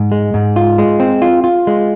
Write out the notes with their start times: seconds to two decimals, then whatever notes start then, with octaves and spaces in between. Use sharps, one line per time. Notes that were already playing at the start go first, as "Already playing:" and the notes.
Already playing: G#2
0.12 G#3
0.34 G#2
0.56 F4
0.78 G#3
1.00 C4
1.22 F4
1.44 F4
1.67 G#3